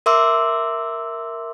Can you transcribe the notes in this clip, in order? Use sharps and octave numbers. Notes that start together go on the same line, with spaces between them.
A#4 E5 C6 D6 E6